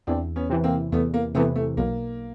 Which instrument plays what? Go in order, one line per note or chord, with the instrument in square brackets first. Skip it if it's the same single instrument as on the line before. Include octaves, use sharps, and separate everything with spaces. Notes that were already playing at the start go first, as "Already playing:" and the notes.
[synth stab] E2 [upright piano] C4 D4
[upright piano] B3 C#4
[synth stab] C3 E3
[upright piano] A#3 C4
[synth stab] E2 [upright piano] A3 B3
[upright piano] A#3
[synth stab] C3 [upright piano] A3 B3
[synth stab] E3
[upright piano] A3
[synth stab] B1 [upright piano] A#3